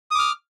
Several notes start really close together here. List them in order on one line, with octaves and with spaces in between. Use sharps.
D#6 D6 F6